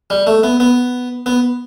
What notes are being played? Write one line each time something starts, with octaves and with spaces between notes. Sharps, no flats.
G3
A3
B3
B3
B3